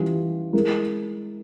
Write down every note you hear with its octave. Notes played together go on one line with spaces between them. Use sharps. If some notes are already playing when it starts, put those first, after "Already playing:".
Already playing: E3 G3 C#4 F4
G#3 E4 A#4